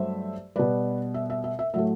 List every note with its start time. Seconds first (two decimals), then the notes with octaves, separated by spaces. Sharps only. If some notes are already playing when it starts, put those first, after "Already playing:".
Already playing: G2 F#3 A3 C5 E5
0.56 B2 G3 B4 D5
1.14 E5
1.30 E5
1.44 E5
1.59 E5
1.73 A2 F#3 A3 E5